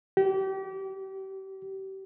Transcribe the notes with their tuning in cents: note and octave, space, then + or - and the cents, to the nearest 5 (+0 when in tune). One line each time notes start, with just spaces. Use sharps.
G4 -35